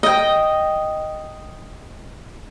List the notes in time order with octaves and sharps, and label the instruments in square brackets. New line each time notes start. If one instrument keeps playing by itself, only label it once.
[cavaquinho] D#5 G5